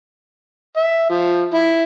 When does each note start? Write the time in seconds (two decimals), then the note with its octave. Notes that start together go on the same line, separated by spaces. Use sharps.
0.76 E5
1.10 F3
1.53 E4